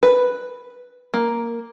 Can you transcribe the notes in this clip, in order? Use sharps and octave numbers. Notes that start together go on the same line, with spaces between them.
B4
A#3